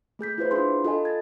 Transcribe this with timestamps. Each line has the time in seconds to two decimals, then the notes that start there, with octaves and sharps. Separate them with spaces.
0.19 A3 G#4 G6 B6
0.38 E4 F4 B4 C5
0.51 D4 F4 G#4 C6
0.84 F4 A4 D#5 G#5
1.05 G#6 A6